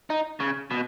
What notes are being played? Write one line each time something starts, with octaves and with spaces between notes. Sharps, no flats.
D#4
C#3
B2